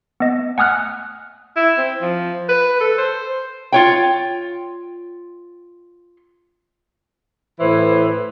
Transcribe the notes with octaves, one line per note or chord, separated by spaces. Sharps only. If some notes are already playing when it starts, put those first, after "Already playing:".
B3 D#5
F#5 G#5 D#6 F6 F#6
E4
C4
F3
B4
A4
C5
F4 C#5 G5
A2 E3 E4 B4 C5